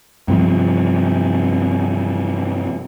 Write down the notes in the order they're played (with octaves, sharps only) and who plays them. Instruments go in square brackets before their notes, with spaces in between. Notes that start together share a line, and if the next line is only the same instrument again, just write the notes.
[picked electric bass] G2 C3 F3